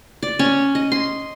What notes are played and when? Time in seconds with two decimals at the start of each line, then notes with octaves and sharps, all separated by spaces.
0.23 D5
0.39 C#4
0.75 D#5
0.92 C6